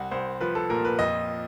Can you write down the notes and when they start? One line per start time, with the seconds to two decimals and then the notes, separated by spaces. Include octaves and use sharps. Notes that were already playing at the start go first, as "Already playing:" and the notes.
Already playing: C2 F#5
0.11 C2 C5
0.41 F3 B4
0.55 A4
0.70 A#2 A#4
0.85 B4
0.99 F2 D#5